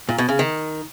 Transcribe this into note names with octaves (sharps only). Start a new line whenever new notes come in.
A#2
B2
C#3
D#3